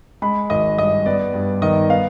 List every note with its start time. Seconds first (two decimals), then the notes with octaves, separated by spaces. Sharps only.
0.22 G#3 B5
0.50 G#1 D#5
0.78 G2 D#5
1.06 B3 D5
1.34 G2
1.62 D#3 D#5
1.90 B3 F5